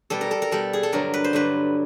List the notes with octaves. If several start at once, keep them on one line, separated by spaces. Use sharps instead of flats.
B2 G3 A4
A#4
A4
A#4
B2 G3 A4
G#4
A4
G2 D3 F#3 A#4
B4
C5
G2 D3 F#3 B4